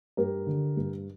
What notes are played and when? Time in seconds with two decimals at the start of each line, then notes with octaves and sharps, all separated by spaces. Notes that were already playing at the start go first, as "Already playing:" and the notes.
0.17 G2 G4 A#4
0.47 D3
0.77 G2